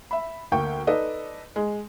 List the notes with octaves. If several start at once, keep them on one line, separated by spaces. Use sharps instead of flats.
E5 B5
D2 A#3 G5 C#6
D#4 A4 B4 D5 D#5
G#3